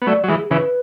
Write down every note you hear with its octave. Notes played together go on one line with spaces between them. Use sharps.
B3
F#3 A3 D5
F#3
E3 G#3 G#4
C#3 E3 B4